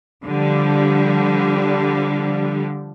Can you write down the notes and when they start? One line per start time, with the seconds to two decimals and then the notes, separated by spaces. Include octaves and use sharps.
0.24 D3 F3 G3